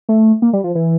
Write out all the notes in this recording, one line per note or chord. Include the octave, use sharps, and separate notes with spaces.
A3
A#3
G3
F3
E3